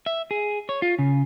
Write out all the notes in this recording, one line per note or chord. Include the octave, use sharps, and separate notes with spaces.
E5
G#4
C#5
F4
C#3